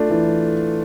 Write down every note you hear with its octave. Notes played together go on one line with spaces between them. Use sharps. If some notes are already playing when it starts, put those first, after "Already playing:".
Already playing: A3 D4 F4
E3